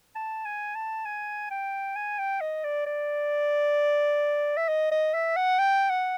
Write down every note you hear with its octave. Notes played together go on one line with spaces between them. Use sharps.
A5
G#5
A5
G#5
G5
G#5
G5
D#5
D5
D5
E5
D#5
D#5
E5
F#5
G5
F#5